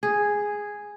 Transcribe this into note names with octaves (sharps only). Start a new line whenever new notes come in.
G#4